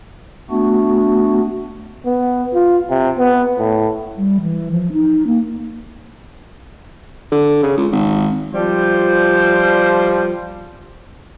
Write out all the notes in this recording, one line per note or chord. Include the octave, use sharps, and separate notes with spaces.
A3 B3 D4 F#4
B3
F4
C3
B3
A2
G3
E3
F3
D#4
A#3
D3
C#3
C#2
G#1
F3 G3 C5